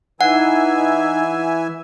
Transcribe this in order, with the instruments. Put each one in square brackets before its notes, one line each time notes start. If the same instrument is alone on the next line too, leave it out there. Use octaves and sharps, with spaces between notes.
[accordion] E3 E5 G#5 [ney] D#4 [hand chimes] F#5